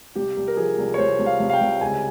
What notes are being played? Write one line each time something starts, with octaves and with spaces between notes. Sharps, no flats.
C2 G4
C2
A#4
F3 G#4
C2
C#5
C2 C5
C2
F5
C2
F5
G5
C2
C#2 G#5